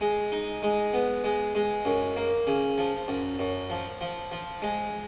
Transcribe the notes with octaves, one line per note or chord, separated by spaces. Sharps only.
G#3
D#4
G#3
B3
G#3
G#3
F#2
A#3
C#3
F3
F#2
F#2
F3
F3
F3
G#3